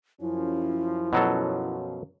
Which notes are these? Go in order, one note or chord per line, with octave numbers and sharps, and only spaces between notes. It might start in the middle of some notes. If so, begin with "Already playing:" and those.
F#2 F3 C#4 E4
B2 F#3 A4